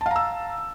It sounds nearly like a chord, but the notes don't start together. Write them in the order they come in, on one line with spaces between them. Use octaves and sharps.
A5 F5 A#5 E6